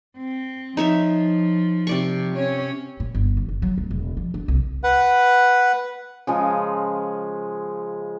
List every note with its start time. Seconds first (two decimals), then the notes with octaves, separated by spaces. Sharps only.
0.17 C4
0.77 F3 D#4 C#5 E5
1.87 C3 D5 C#6
2.34 C#4 C#5
3.00 A#2
3.15 G1
3.37 D#2
3.49 F#1
3.62 F#3
3.78 D1
3.91 E1
4.17 F3
4.34 D4
4.48 C2
4.83 B4 F#5
6.27 C#3 F3 G#3